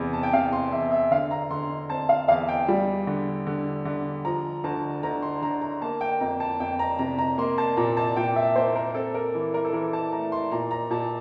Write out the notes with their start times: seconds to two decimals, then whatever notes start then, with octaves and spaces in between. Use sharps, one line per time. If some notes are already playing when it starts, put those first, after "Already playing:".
Already playing: E2 C3
0.13 A5
0.23 G5
0.33 C3 F5
0.53 C6
0.72 E2 E5
0.91 E5
1.11 D3 F5
1.31 A#5
1.51 D3 C6
1.90 C4 A5
2.09 F5
2.28 E2 F5
2.48 G5
2.68 G3
3.07 D3
3.47 D3
3.85 D3
4.25 F3 A#5
4.64 D2 A5
5.03 D2 A#5
5.22 C6
5.42 D3 A#5
5.61 A#5
5.82 A#3 A5
6.01 G5
6.20 F2 A#5
6.40 A5
6.60 F2 G5
6.79 A#5
6.99 C3 A#5
7.18 A#5
7.38 A#3 C6
7.58 A5
7.77 A#2 A#5
7.97 A5
8.16 A#2 G5
8.36 E5
8.56 A#3 C5
8.75 A#4
8.95 C4 A4
9.14 A#4
9.35 E3
9.54 A#4
9.65 A4
9.73 E3 A#4
9.93 A5
10.12 A3 A#5
10.32 C6
10.51 A#2 A#5
10.71 A#5
10.90 A#2 A5